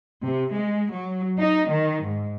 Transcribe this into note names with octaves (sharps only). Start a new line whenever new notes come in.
C3
G#3
F#3
D#4
D#3
G#2